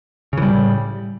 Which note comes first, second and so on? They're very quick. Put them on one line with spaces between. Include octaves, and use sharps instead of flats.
C#3 E3 G3 A2